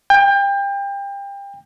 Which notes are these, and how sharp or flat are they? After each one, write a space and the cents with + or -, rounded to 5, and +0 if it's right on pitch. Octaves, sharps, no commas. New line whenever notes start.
G5 +30